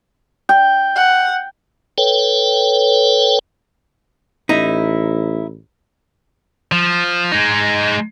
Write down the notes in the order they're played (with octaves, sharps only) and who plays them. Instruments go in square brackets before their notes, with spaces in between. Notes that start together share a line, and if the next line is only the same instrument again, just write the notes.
[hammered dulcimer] G5
[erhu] F#5
[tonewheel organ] A4 B4 C#5 G5
[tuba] A1 [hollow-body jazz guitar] D#4 E4
[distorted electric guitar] F3
G#3 D#4